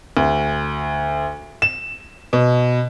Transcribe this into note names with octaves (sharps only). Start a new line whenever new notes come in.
D2
E7
B2